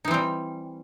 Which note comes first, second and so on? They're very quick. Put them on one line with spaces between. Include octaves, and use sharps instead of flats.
D#4 E3 C4 G3